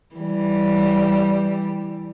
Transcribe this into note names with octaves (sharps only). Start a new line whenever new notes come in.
E3 G3